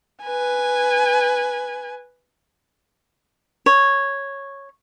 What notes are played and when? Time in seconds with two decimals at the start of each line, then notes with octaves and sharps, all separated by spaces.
0.23 B4 G#5
3.66 C#5